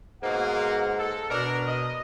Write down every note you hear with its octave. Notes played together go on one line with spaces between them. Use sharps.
G#2 B2 A#3 F#5
A4
B2 D4 A#4
D#5